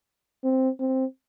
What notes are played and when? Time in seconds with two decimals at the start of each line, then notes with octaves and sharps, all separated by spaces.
0.44 C4
0.80 C4